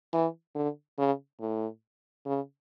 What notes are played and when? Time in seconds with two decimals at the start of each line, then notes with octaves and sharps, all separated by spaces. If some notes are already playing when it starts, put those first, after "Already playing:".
0.13 E3
0.55 D3
0.99 C#3
1.41 A2
2.26 C#3